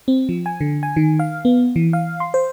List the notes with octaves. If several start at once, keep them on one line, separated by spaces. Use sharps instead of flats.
C4
F3
G#5
D3
G#5
D#3
F5
B3
E3
F5
C6
C5